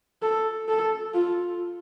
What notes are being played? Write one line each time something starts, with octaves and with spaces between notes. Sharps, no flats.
A4
A4
F4